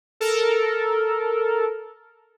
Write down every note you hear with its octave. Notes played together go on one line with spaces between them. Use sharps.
A4 A#4